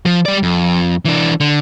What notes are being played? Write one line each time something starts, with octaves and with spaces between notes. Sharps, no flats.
F3
G3 D5
F2
E3 D4
D3